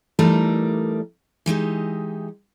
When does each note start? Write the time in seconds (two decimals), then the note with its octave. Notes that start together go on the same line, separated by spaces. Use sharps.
0.19 E3 G3 A3 D#4 A#4 D5
1.46 E3 G#3 D#4 G4